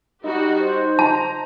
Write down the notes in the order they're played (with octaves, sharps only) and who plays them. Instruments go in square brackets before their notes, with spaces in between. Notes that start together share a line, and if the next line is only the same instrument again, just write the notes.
[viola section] G3 F#4 G4 [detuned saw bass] D#4
[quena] C5
[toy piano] A5 [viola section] A#5